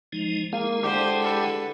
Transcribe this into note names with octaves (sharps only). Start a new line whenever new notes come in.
F3 G#3 D#4
G#3 A#3 E4 G#4
D3 G4 C5
A4 B4